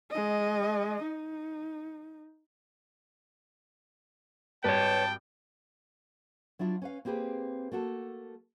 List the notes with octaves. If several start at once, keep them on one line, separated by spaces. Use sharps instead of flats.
G#3 D#5
D#4
G#1 G3 B4 C#5 G5 A5
F#3 D4 E4 F4
C#4 B4 F5
A#3 C4 G4 G#4 B4
A3 A#3 F#4 A4